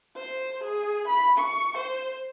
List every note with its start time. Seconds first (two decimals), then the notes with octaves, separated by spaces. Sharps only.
0.17 C5
0.64 G#4
1.08 B5
1.38 C#6
1.77 C5